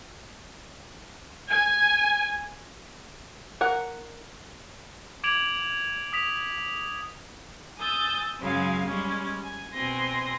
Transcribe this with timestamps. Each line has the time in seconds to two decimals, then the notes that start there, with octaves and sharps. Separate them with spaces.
1.50 G#5
3.61 A#4 F#5
5.24 D6 G#6 D7 F7 F#7
6.13 D#6 B6 F7
7.79 G#5 D#6 E6 G6 A6
8.40 F#2 C#3 F#3 G#3 F5 G#5
8.86 G3 G#3 C#4
9.43 G#5
9.73 B2 C4 G#5 C6 A#6